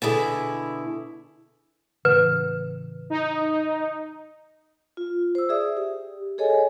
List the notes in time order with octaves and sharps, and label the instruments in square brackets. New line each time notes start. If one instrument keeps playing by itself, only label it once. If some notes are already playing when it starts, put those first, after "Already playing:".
[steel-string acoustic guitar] B2 D3 E4 G#4
[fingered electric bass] A2 C#3 E3 [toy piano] B4
[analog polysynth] D#4
[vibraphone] F4
C5 E6
G#4 D5 E5 D#6
G4
G#4 A4 C#5 D#5 G#5